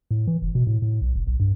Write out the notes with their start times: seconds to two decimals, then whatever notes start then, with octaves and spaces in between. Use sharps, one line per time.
0.11 A2
0.27 E3
0.42 F1
0.55 B2
0.67 A2
0.82 A2
1.01 B1
1.16 F1
1.27 B1
1.40 G2